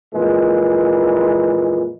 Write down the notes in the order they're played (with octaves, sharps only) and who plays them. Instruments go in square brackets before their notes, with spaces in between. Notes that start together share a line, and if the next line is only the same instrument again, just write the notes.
[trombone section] F2 A#2 E3 G#3